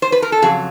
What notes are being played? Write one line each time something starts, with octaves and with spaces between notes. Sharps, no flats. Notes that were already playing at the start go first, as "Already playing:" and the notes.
C5
B4
A#4
A4
F2 C#3 F#3 G#4